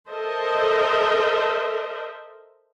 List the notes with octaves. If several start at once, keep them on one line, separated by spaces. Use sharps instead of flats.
A4 A#4 C5 D#5 E5